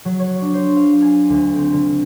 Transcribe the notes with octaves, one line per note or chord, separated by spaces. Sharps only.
F#3
C#5
D4
C5
F5
G#5
D2
C4
D3